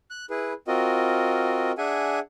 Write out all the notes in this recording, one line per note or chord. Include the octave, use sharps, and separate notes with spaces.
F#6
E4 G#4 B4
C4 F4 F#4 A#4 D#5
D4 G#4 E5 F#5 G#5